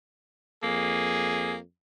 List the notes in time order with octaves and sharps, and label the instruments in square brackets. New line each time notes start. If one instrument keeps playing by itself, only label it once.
[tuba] F2 [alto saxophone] A#3 [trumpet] G#4